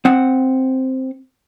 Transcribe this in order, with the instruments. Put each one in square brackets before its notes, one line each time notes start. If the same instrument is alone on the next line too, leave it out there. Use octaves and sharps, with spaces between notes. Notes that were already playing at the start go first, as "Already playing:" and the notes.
[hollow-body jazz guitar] C4 F#5